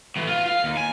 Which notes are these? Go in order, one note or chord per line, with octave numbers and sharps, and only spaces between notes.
A2 E3
F4
F5
D#2
G#5